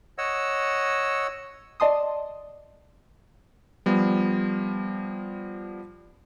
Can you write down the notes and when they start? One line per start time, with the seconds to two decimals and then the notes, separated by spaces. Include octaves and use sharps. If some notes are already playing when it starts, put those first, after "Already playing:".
0.18 C#5 D#5 F#5 E6
1.80 D5 D#5 A5 C6 D#6
3.86 F3 G3 B3